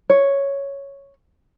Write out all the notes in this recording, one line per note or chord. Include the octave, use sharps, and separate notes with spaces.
C#5